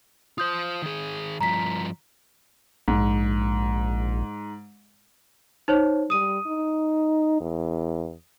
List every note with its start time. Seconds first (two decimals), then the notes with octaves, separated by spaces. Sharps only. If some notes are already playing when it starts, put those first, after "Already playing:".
0.38 F4 C5 D#6 G6
0.82 D#3 G#4
1.41 G2 F3 A#5 B6
2.88 A#1 G#2
5.68 D#4 C5 C#5
6.10 G3 D#6 D#7
6.47 D#4
7.41 E2